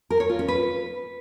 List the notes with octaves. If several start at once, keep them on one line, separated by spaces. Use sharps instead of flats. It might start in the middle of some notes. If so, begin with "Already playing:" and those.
A#4
C#5
F4
C#4
B4